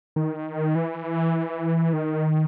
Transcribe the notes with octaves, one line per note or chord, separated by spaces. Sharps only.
D#3
E3
D#3